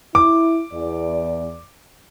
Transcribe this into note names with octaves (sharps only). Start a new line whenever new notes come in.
E4 D6
E2 D5